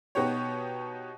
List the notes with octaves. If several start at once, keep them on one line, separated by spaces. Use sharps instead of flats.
B2 B3 D#4 F#4 G4 C#5